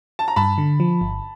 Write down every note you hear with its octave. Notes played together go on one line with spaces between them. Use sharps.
A5
A#5
G2 A5 B5
D3
F3
G1